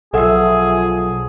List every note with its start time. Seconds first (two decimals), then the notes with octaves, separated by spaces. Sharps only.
0.14 B1 F3 G#4 A4 E5 F#5